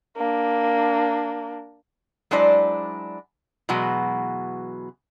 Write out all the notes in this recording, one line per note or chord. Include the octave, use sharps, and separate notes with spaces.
A#3 D4
F#3 G#3 D4 E4 C5 D5
B2 E3 F#3 G#3 F#4